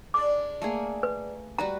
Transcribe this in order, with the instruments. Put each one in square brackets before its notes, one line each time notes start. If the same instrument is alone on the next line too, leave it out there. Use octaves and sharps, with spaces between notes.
[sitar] G#3 D4 D5 [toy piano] D6
[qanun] A3 A#3 G#4
[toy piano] B4
[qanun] G3 F#4 B4 [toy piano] A#5